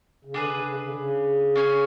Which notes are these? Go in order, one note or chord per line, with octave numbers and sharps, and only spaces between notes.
C#3
D3 D4 G#4 B4
C#3
C#3
C#3
D3
C#3
C#4 G#4 C#5 G#5